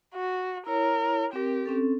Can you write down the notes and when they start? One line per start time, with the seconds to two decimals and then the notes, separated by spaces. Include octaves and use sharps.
0.14 F#4
0.67 E4 A#4 C#5
1.33 C4 G4 A#4
1.66 C4 C#4 A4